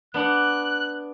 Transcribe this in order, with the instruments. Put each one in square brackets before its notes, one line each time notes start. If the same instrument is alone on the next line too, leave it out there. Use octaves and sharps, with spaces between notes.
[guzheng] B3 D4 F#5 [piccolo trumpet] F#6